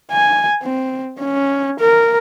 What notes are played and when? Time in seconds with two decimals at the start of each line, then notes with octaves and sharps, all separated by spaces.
0.12 G#5
0.63 C4
1.20 C#4
1.80 A#4